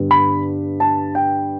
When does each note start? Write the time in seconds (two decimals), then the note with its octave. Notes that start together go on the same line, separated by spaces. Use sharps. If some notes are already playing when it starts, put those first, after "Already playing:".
Already playing: G2 D3 G3 B3
0.11 B5
0.80 A5
1.15 G5